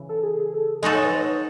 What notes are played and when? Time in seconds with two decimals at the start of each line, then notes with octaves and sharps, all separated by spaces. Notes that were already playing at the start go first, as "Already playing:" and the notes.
Already playing: C#3 E3
0.09 A4
0.23 G#4
0.54 A4
0.82 G#3 D#4 F#4 A4 D#5
0.94 C#5
1.05 B4
1.16 C#5